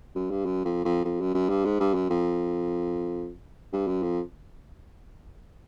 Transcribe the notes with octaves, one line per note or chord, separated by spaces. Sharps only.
F#2
G2
F#2
F2
F2
F2
F#2
F#2
G2
G#2
G2
F#2
F2
G2
F#2
F2